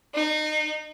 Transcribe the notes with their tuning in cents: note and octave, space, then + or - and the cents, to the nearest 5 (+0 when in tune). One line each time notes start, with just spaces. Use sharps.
D#4 -25